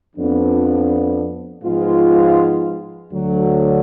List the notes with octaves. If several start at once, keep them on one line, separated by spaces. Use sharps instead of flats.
F2 F3 B3 D4
G#2 F3 G#3 B3 F4
D2 D3 F#3